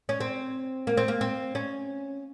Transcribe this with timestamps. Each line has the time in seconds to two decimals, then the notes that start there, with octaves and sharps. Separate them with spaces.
0.09 C#4
0.20 C4
0.87 A#3
0.97 C4
1.08 A#3
1.21 C4
1.55 C#4